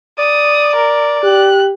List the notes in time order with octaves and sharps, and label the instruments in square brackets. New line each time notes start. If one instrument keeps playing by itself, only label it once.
[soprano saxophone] D5 [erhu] D#6
[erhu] A#4
[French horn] G4 [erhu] F#6